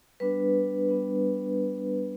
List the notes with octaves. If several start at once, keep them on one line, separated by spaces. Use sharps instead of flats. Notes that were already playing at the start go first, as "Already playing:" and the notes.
G3 B3 D4 B4
G3 B3 D4